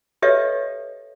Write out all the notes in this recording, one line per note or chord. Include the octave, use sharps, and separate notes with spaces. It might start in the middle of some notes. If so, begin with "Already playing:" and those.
G4 A4 B4 C#5 D#5 E5